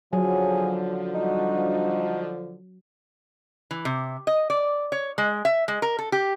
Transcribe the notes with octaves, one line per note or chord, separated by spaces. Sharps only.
D3 F3 F#3 G#4
G3 D4 D#4 F#4
E3
C3
D#5
D5
C#5
G#3
E5
G#3
A#4
A4
G4